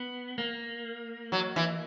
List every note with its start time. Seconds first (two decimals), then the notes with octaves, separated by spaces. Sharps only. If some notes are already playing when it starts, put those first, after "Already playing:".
Already playing: B3
0.38 A#3
1.32 F#3
1.56 E3